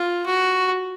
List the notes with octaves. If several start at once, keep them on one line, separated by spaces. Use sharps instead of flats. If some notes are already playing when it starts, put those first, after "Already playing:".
Already playing: F4
F#4